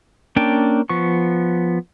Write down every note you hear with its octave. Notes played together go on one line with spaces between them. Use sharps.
A#3 C#4 D4 G5 A5
F3 B3 C#6